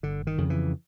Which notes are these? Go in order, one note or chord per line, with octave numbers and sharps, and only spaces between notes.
G1 D3
D#3
F2 C#3
E3